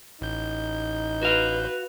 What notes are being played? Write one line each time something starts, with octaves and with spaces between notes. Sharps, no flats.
A1 D#4 G6
F#4 B4 F5